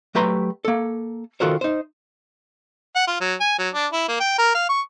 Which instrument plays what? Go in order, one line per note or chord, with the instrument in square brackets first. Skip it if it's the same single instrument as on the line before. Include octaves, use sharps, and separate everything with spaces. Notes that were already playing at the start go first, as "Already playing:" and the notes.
[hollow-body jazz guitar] F#3 A3 G4 B4 A#5 C6
A#3 A4
D#3 F4 F#4 A4 A#4 C5
D#4 C5
[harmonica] F#5
F4
F#3
G#5
F#3
D4
E4
A#3
G5
A#4
F5
C#6